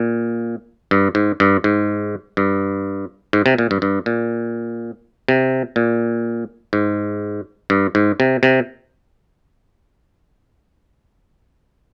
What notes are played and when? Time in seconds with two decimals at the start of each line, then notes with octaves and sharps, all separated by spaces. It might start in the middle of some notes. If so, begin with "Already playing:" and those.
Already playing: A#2
0.91 G2
1.15 G#2
1.40 G2
1.64 G#2
2.37 G2
3.33 G#2
3.46 C3
3.58 A#2
3.71 G2
3.82 G2
4.06 A#2
5.29 C3
5.76 A#2
6.73 G#2
7.70 G2
7.95 G#2
8.20 C3
8.43 C3